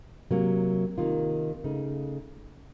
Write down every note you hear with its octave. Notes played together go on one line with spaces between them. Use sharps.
C3 F#3 A#3
C3 D#3 A#3 F4
C#3 A3 D#4